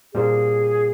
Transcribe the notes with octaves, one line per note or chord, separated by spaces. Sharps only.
A#2 G3 C4 F4 G#4 C5